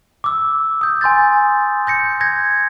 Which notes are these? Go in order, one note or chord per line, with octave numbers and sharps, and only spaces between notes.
D6 E6
D#6 G6
G#5 C6 G6 A6
G6 A#6 C#7
G6 G#6 A#6